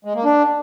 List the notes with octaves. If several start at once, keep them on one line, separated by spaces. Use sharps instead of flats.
G#3
A#3
D4